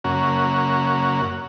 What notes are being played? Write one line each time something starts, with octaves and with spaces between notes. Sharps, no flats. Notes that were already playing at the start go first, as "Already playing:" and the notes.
F#2 C#3 A#3 C#4 F#4